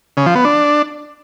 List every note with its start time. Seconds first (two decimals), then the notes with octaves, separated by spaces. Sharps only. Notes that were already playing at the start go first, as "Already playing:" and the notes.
0.17 C#3
0.26 F3
0.35 B3
0.45 D4